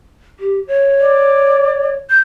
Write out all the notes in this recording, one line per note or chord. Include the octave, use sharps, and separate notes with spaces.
G4
C#5
D5
G6